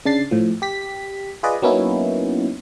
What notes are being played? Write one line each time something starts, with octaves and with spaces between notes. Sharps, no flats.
C#3 D4 A6 C7
A2 F3
G4 B6
F4 G#4 B4 D5 D#5
F#3 A#3 B3 C#4 D#4 E4